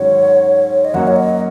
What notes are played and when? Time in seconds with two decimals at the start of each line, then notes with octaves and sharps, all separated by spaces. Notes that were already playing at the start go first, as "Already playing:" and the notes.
Already playing: G#2 D#3 F#3 C#4 F#4 C#5
0.85 D#5
0.94 F#2 F#3 A#3 C#4 F#4 F#5
1.07 C#5
1.16 D#5